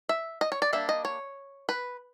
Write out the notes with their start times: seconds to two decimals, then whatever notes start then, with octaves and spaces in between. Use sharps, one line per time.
0.09 E5
0.41 D#5
0.52 C#5
0.62 D5
0.73 G3 A#3 D4 E5
0.89 D#5
1.05 C#5
1.69 B4